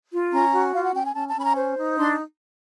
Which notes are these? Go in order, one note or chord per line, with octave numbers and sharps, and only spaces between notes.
F4
C#4 A#5
F#4
F4 F5
F#5
C#4 G5
G#5
C#4 A5
A5
C#4 B5
A#5
C5
D#4
D4 C6